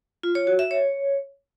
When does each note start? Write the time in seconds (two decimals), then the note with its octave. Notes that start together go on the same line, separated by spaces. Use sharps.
0.23 F4
0.35 C#5
0.47 F#4
0.59 E5
0.71 C#5